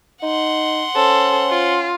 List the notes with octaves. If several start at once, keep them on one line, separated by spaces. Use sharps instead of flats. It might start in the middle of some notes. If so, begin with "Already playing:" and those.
D#4 F#5 C6
C#4 A4 C5
F4